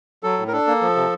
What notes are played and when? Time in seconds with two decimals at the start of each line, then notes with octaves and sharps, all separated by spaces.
0.23 F#3 A4
0.38 A2
0.48 A#4
0.53 D4 A4
0.67 A#3
0.81 F3
0.96 C3